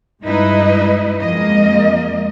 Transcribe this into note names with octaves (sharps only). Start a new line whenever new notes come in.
G2 G#3 D#4 E4 B4 D#5
F2 G#3 A#3 D#5